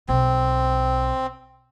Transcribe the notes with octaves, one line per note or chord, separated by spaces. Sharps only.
B1 C4